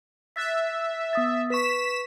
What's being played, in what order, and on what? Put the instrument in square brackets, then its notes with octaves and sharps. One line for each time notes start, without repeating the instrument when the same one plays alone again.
[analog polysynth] E5 [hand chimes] F#6 A6 B6
[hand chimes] B3 D#6 A6
[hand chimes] B4 C#6 [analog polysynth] B6 E7